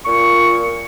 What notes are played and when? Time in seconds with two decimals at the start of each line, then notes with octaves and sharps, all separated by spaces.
0.05 A#2 C#6